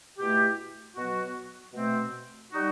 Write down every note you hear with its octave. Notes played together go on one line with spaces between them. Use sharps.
B2 A3 E4 G4
B2 F#3 B3 F#4
B2 A3 C4
G3 D#4 F#4